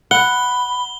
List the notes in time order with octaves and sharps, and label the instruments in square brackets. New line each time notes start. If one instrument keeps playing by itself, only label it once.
[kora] F#5 [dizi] B5 [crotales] G7